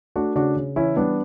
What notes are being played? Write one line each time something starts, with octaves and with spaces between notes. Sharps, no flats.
A3 D4 F#4
C#3 D4 F#4
C#3
E3 C#4 E4
G3 B3 D4